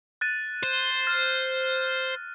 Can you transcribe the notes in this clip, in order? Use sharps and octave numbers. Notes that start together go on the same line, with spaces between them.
F#6 A6 D#7
C5
F6 A6